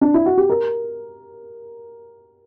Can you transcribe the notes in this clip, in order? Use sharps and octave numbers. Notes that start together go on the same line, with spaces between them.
D4
E4
F#4
G4
A#4